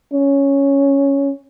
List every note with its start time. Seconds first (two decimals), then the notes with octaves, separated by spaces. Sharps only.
0.14 C#4